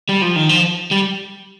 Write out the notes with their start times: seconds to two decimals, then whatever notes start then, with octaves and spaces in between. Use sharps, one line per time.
0.09 G3
0.22 F3
0.36 D#3
0.49 F3
0.91 G3